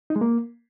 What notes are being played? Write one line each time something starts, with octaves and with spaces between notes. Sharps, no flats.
D#4
G#3
A#3